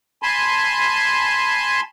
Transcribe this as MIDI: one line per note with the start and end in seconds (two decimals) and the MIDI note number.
0.23 1.81 80
0.23 1.81 81
0.23 1.81 83
0.23 1.81 84